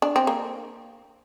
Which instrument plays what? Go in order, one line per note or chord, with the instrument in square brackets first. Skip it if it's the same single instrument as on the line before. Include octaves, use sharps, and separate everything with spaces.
[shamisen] D4
C4
A#3